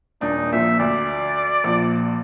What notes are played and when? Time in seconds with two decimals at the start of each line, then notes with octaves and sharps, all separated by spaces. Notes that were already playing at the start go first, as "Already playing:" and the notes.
0.21 D#1 D4 D#4
0.52 A#1 A#2 E5
0.79 D2 D5
1.64 A#1 A#2